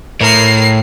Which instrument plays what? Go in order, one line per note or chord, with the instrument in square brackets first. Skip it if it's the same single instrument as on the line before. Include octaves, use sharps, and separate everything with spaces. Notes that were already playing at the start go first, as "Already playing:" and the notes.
[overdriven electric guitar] A2 [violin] A#4 C7